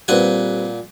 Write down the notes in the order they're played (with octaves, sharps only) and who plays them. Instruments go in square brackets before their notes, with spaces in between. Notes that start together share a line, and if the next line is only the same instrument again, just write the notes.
[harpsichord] A#2 F#5 G#5 [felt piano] G3 C4 B4